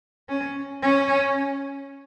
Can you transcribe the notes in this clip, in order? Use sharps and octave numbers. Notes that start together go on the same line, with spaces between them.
C#4
C#4